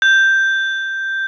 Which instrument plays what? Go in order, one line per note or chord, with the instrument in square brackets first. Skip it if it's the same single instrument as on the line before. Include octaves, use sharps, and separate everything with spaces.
[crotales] G6